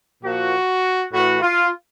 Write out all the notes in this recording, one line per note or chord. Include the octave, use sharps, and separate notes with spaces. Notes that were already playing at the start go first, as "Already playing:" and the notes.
A#2 F3 F#4
A2 E3 F#4
F4